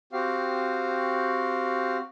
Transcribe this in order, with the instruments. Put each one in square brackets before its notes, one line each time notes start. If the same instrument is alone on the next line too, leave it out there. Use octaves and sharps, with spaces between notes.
[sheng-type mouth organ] C4 F#4 G4 F5